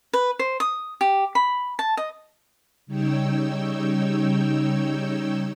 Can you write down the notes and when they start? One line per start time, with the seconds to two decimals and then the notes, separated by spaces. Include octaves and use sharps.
0.13 B4
0.39 C5
0.60 D#6
1.01 G4
1.35 B5
1.79 A5
1.97 D#5
2.86 C#3 G3 D#4 C#5 G5 E6